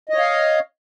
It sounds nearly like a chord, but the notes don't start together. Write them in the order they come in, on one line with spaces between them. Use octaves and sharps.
D#5 C#5 F5